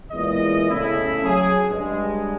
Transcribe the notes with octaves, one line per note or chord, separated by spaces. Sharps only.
E2 A#2 G#3 E4 D#5
C#3 A3 E4
F#3 G#4
G2 G#3